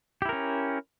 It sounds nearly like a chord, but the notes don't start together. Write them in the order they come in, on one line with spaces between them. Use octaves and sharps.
G4 E4 A#4 C#4